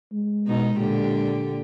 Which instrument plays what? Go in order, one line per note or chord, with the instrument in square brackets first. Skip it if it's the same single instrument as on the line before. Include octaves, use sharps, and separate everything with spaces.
[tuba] G#3
[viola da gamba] B2 D#4
A#2 D3 G4